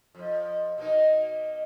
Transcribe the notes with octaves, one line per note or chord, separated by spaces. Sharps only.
F2 F3
B2 A#3 D#4